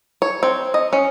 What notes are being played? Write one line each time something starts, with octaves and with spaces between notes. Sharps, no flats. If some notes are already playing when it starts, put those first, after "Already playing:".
C#5
C4
D#5
C#4